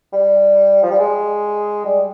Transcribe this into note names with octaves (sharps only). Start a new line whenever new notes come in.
G3
F3
G3
G#3
G3